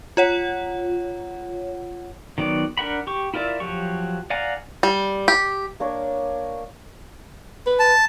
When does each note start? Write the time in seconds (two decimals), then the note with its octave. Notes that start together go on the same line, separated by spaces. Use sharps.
0.17 F4 C#5 F#5
2.38 D#3 F#3 B3 D5
2.78 D4 A#4 F#5 B5
3.07 G4 C#6
3.34 E4 F4 A#4 D5 E5
3.60 F3 F#3 G4 C#6
4.30 D5 F5 F#5 G#5 A#5
4.83 G3
5.28 G4
5.80 A#3 D4 A#4 C#5
7.66 B4
7.80 A5